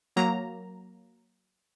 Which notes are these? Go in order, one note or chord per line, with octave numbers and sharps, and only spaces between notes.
F#3 A#3 A#5